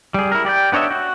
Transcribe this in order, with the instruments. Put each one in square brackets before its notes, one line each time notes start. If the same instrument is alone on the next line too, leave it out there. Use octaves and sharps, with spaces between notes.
[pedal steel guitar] G3 G#4
E4 A#4
G4 D5 D#5 G5
B3 D4 C#5 D#5 E5
F#4